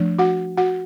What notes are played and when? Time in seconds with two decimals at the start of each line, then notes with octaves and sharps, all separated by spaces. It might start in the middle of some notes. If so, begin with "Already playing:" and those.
Already playing: F3 A3 D4
0.19 F#4 F#5
0.57 F#4 F#5